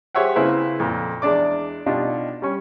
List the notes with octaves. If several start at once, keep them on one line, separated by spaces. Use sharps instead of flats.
G4 G#4 C5 C#5 E5 F#5
C#3 A#3 C4 E4 G#4 B4
F2 A#2
E2 G#3 D4 D5 D6
B2 D4 D#4 F4 G4
G3 C#4